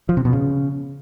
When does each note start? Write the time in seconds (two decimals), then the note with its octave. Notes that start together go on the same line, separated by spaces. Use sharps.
0.09 F3
0.17 C3
0.25 B2
0.33 C#3